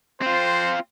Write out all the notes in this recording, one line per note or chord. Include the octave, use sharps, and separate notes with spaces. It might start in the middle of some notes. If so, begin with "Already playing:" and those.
C4 F4 C5